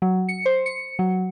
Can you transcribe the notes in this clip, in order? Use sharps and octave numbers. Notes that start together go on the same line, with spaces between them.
F#3
C#7
C5
C#7
F#3